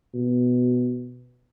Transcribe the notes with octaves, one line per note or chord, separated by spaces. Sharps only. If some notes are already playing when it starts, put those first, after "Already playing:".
B2